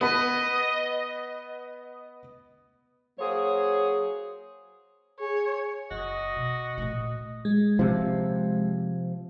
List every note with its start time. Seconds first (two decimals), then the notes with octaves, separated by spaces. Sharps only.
0.01 B3 B4 D#5
3.19 F#3 A#3 G#4 C5 C#5
5.19 G#4 C#5
5.91 F#1 F#4 D#5
6.36 B2
6.78 A#2 A3
7.45 G#3
7.79 C3 F3